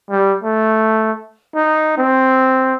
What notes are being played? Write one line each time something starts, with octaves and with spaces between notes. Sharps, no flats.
G3
A3
D#4
C4